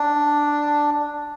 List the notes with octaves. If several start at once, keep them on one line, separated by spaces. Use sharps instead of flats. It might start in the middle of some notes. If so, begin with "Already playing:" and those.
Already playing: D4